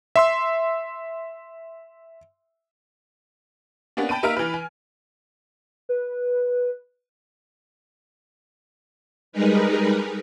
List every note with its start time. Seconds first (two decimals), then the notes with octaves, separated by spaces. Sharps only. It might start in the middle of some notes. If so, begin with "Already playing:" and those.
0.16 E5 C6 E6
3.97 A#3 B3 C#4 D4
4.09 G5 A5 B5 D7 D#7
4.23 A#3 D#4 E5 A#5 F6 D7
4.37 E3 B4
4.54 G#5
5.89 B4
9.32 G3 G#3 D#4 G#4 A#4 B4